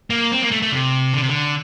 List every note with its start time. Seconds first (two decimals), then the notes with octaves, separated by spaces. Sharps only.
0.10 A#3
0.32 C4
0.42 A#3
0.51 A3
0.62 A3
0.72 C3
1.14 D3
1.21 C3
1.29 D3